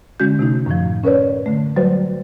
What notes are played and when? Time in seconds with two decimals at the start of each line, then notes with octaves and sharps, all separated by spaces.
0.20 D3 G#3 C#4 F#4 G6
0.39 C3 A3 D#4
0.66 F#2 A2 D#3 F3
1.04 C#4 A#4 B4 C#5 D5
1.46 D3 A3
1.76 F#3 G3 F#4 B4 C5 D5